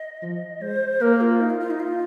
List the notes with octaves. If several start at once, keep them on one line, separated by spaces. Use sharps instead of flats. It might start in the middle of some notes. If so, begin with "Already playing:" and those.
Already playing: D#5
F3
G#3 C5
A#3 A#4
F4
D#4
F4
F4
D#4
F4